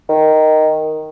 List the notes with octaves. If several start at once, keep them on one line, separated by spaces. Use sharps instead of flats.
D#3